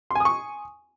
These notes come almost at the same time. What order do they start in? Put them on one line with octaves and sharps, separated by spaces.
C6 G#5 D#6 C#6